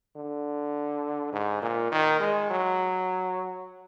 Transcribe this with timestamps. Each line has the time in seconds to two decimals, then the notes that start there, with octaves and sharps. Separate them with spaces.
0.16 D3
1.33 G#2
1.62 A#2
1.92 D#3
2.20 G#3
2.50 F#3